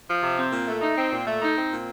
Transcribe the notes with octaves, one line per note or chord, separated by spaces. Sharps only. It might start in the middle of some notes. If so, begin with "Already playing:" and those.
F3
C3
C4
A#2
A3
D#4
C4
A#2
A3
D#4
C4
A#2